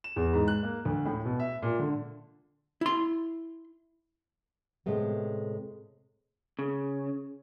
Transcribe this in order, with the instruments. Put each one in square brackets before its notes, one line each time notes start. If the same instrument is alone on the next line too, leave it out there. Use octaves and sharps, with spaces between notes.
[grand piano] E7
E2
G#2
F#6
A#3
D2
A2
B2
E5
A#2
D3
[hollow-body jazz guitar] E4 C6
[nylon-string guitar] A2 C3 G#3 A3 B3
[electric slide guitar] C#3